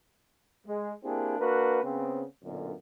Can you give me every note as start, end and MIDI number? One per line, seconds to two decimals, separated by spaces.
0.66 0.92 56
1.04 1.37 58
1.04 1.37 60
1.04 1.37 62
1.04 1.37 64
1.04 1.37 67
1.04 1.37 68
1.39 1.82 58
1.39 1.82 62
1.39 1.82 66
1.39 1.82 70
1.39 1.82 71
1.83 2.23 49
1.83 2.23 59
1.83 2.23 60
2.43 2.72 35
2.43 2.72 42
2.43 2.72 46
2.43 2.72 50